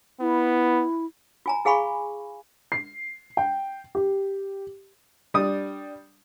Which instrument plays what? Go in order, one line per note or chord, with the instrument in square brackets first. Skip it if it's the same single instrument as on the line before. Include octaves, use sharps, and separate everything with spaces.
[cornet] B3 [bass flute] E4
[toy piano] F4 G#5 A#5
E4 G#4 F5 G#5 B5 C#6
[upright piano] C7
G5
G4
[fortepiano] G3 D4 D#6